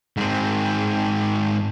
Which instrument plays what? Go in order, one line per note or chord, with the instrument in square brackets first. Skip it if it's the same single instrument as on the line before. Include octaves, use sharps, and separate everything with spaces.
[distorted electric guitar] G#2 C4